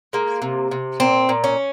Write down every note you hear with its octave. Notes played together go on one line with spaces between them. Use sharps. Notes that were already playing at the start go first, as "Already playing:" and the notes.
G#3 A#3
C3
C3
A#2 C4
A#2
C#4